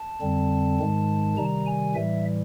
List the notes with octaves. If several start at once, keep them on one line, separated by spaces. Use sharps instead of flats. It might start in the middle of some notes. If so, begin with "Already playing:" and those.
Already playing: A5
F2 D3 G3 C4
G#2 D#3 G#3
C3 D#3 G3 A#5
G#5
A2 E3 G3 E5